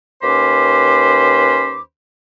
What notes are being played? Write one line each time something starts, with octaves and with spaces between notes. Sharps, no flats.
D#2 C#4 B4 C5 B5 D6